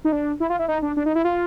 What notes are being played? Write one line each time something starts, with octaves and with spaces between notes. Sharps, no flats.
D#4
D4
E4
F4
E4
D#4
D4
D4
D#4
E4
F4